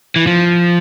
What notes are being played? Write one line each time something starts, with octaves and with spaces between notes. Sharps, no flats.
E3
F3